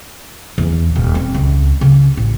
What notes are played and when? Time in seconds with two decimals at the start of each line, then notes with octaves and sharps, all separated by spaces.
0.58 E2
0.95 D#1
1.15 C4
1.34 C#2
1.81 C#3
2.17 A1